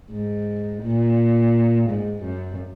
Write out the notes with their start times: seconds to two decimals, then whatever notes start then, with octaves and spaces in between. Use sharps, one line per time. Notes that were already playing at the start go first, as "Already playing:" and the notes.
0.12 G#2
0.82 A#2
1.89 G#2
2.23 F#2